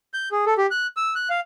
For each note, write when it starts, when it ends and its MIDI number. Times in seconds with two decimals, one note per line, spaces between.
0.14 0.29 91
0.32 0.45 68
0.46 0.54 69
0.58 0.66 67
0.71 0.87 90
0.97 1.14 88
1.15 1.28 90
1.30 1.40 77